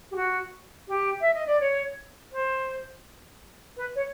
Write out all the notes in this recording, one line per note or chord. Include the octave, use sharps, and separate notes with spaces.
G4
F#4
G4
E5
D#5
D5
C#5
C5
B4
C#5